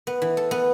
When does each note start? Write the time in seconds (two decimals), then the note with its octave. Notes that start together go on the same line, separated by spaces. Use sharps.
0.07 B3
0.22 E3
0.37 A4
0.51 B3